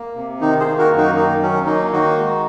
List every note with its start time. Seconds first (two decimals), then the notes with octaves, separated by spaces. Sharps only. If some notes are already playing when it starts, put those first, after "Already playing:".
Already playing: A#3
0.15 C3
0.41 D#3 D#4
0.60 G#4 C5
0.66 A#3
0.78 F#4 A#4
0.91 F#2
0.98 D#4 F#4
1.16 D#3 D#4
1.42 F#3 C#4
1.67 A#3 D#4
1.92 D#3 D#4 F#4
2.18 G#3